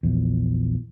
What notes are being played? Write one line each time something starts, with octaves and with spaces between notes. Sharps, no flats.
A#1 E2